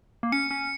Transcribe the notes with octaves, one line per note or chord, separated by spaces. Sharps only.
A#3
C#4 C#7
C#4